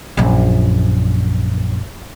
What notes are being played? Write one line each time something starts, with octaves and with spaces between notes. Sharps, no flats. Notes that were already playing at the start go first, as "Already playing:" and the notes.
A#1 F#2